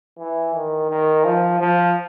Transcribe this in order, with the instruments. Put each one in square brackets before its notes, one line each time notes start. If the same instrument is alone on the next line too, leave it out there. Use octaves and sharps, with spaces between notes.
[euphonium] E3
D#3
D#3
F3
F3